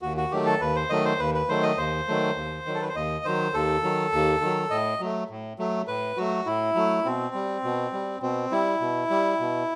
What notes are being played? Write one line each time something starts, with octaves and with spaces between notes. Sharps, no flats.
D#2 F#4
F#4
D#3 F#3 A3 G4
A4
D#2 B4
C5
D#3 F#3 A3 D#5
C5
D#2 B4
B4
D#3 F#3 A3 C5
D#5
D#2 C5
D#3 F#3 A3
D#2
D#3 F#3
A4
B4
C5
D#2 D#5
D#3 F#3 C5
D#2 A4
D#3 F#3
D#2
D#3 F#3
A2 D#5
F#3 A3
A2
F#3 A3
A2 B4
F#3 A3 F#4
A2 E4
F#3 A3
B2 C4
G3
B2
G3
B2 C4
G3 E4
B2
G3
B2